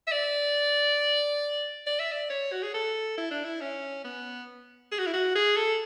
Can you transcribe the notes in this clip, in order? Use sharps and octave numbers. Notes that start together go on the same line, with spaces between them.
E5
D5
D5
E5
D5
C#5
F#4
G#4
A4
E4
D4
E4
C#4
B3
G#4
F#4
E4
F#4
G#4
A4